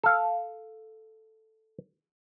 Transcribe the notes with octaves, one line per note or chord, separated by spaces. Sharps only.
A4 F5